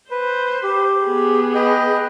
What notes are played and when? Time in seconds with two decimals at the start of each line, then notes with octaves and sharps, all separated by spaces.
0.11 B4 C5
0.63 G4
1.05 B3 G#4
1.55 B4 D#5 G5